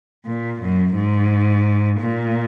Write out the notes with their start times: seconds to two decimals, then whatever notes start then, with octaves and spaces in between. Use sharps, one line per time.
0.26 A#2
0.61 F#2
0.95 G#2
2.00 A#2